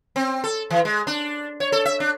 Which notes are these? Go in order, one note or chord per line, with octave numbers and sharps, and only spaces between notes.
C4
A4
E3
G#3
D4
C#5
A4
E5
D4